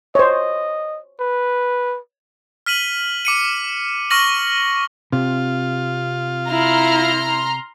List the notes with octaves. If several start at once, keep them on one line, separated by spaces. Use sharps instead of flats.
C5 C#5 D#5
B4
F6 B6 D#7 F#7
D6 C#7 D#7
C#6 F6 A#6 F#7
C3 F4
E4 A#5 C6 F6